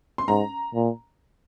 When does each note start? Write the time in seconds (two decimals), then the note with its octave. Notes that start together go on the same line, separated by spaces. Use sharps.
0.18 C6
0.28 G#2 A#5
0.75 A#2